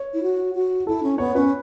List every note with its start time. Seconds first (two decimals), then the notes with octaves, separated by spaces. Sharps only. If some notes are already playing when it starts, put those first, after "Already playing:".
Already playing: C#5
0.14 E4
0.23 F#4
0.55 F#4
0.87 E4 A4
1.03 C#4
1.18 B3 C#5
1.35 C#4 B4